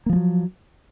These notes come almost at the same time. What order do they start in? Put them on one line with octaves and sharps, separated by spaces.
A#3 F3 G#3 F#3